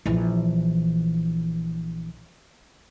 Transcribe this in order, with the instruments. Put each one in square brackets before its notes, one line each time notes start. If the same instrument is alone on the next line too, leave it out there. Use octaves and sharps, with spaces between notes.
[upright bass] A#1 E3